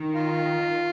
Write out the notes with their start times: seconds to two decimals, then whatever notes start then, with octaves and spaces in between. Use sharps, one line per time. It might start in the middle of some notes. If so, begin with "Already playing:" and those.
Already playing: D#3
0.16 F4